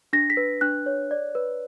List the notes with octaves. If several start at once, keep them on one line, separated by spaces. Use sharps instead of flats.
D4 A#6
B6
B4
D4 F#6
C#5
D5
B4